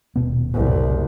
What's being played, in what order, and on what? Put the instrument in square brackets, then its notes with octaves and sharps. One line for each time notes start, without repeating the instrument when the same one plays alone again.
[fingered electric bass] D#1 B2 B3
[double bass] F#1 C2